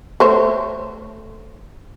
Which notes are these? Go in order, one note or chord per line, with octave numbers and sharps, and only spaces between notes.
A3 C5 C#5